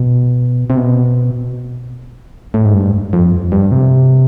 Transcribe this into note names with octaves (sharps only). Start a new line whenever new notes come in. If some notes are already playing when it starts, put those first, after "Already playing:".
Already playing: B2
C3
B2
A2
G#2
G2
F2
G2
C3